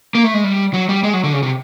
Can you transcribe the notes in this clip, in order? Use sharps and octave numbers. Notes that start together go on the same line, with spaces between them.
A#3
A3
G#3
G3
F#3
G3
G#3
F#3
D3
C#3
C3